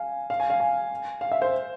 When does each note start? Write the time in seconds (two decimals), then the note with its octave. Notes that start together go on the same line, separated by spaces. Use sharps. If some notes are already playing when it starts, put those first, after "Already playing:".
Already playing: F5 G#5
0.30 F5
0.40 G#5
0.50 F5
0.60 G#5
1.21 F5
1.32 E5
1.42 C5